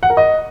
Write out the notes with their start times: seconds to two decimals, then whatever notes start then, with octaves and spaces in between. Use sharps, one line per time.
0.03 F#5
0.10 A#4
0.17 D#5